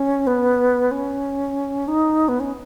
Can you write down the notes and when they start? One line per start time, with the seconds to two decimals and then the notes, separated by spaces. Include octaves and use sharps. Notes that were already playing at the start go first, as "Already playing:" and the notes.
Already playing: C#4
0.27 B3
0.91 C#4
1.88 D#4
2.28 B3
2.40 C#4